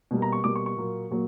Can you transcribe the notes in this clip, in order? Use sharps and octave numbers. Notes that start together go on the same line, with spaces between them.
B2 G3 A#3
A#5
C#6
B2 G3 A#3 D6
C#6
C#6
A#2 F#3 A#3
A#2 F#3 A#3